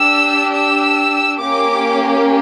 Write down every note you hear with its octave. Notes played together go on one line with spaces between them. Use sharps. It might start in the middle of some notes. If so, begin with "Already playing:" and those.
Already playing: D4 G4 E6
E6
A#3 C#4 G4 D6